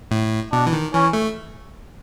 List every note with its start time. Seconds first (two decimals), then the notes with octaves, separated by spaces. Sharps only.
0.11 A2
0.52 B2 D4
0.67 E3
0.73 D#3
0.93 E3 C#4
1.13 A3